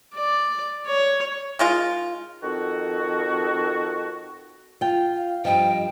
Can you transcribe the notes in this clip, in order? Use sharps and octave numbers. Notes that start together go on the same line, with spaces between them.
D5
C#5
D#3 G#3 F4
F2 D#3 F#4
F4 G5
F5
G2 F3 D#5 G5